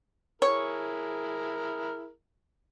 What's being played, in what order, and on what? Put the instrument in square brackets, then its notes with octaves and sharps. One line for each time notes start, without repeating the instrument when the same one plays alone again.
[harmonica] E4 G#4 A#4 [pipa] C#5